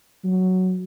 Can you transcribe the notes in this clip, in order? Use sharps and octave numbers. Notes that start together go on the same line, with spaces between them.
F#3